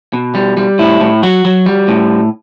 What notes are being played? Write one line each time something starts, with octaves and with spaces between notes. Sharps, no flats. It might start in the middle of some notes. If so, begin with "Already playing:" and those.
B2
G3
G3
A2 E4
A2
F#3 F#4
F#3
G3
A2